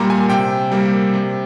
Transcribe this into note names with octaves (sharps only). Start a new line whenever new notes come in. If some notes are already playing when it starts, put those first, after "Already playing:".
Already playing: A#2 G3 A#3 A#5 C6
G#5
C3 G5
G3 A#3
C3